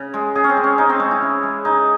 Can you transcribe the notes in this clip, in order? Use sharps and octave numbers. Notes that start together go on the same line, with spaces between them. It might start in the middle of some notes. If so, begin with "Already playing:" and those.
Already playing: C#3
G#3
C#3 G#4
C#4
C4
G#3
C#4
C#3 D#4
C4
G#3 C#4
E4
C#3
G#3
C#3 D#4